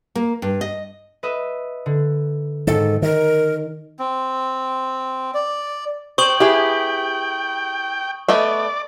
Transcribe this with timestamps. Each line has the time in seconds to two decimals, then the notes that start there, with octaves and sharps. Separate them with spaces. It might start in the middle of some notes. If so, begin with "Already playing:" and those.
0.15 A#3
0.42 G2
0.61 D#5
1.23 B4 D#5 E5
1.86 D3
2.67 G#2 D#3 A4
3.02 D#3 A#4
3.99 C4
5.34 D5
6.18 C5 G5 C#6 D#6 F#7
6.40 B3 E4 G4 G#4
8.29 A3 B3 D5 D#5